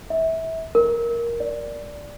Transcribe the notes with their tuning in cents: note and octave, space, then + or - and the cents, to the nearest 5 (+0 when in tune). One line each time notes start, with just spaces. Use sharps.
E5 -25
A#4 +10
D5 -5